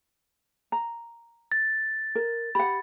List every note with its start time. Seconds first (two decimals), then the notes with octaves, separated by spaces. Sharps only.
0.72 A#5
1.52 A6
2.15 A#4
2.55 G4 F#5 B5